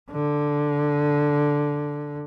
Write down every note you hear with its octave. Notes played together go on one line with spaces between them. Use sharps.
D3